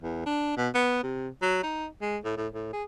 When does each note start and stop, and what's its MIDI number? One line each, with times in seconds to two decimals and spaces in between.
0.02 0.24 40
0.26 0.53 62
0.57 0.69 47
0.74 1.02 59
1.03 1.28 48
1.42 1.58 54
1.63 1.86 63
2.01 2.17 56
2.24 2.33 45
2.37 2.47 45
2.52 2.70 45
2.73 2.84 68